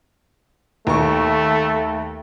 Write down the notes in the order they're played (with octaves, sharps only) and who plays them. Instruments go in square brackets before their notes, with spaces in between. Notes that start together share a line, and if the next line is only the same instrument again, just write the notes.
[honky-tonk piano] D#2 C#6 [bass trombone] A3